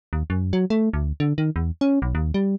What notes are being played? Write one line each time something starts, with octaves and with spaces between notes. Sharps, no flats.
D#2
F#2
F#3
A3
D2
D3
D#3
E2
C#4
B1
D#2
G3